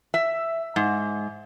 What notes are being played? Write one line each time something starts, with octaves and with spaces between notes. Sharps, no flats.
E5
G#2